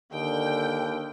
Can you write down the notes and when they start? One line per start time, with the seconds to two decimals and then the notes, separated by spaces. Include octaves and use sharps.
0.13 D#2 D3 G5